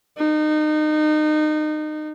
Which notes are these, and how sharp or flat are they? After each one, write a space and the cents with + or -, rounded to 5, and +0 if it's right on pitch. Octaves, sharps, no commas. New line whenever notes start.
D#4 -25